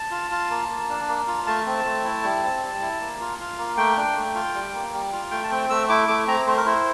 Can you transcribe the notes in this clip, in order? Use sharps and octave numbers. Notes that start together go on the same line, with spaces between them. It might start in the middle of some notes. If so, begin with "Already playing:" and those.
Already playing: A5
F4
F4
A#3
A#3
D4
A#3
F4
A3 A5
C4
A3
E4
G3
C4
G3
E4
A#3
F4
F4
A#3
A3 G5
D4
A3
F4
G3
A#3
G3
F4
A3 G5
A5
C4 G5
A3 E6
E4 D6
A3 D6
C4 A#5
A3 C5
A#4
E4 C5